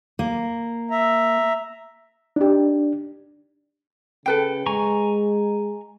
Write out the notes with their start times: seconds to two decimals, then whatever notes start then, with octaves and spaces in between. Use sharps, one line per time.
0.19 A#3
0.91 E5 A#5
2.36 D4 D#4 G4
4.26 C#3 A4 B4 G5
4.66 G#3 G#5 A#5 C#6